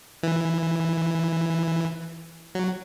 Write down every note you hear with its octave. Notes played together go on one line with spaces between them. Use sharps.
E3
F#3